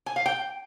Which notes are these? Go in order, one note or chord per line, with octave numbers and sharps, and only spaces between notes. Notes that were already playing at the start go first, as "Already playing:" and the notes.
G#5
F5
G5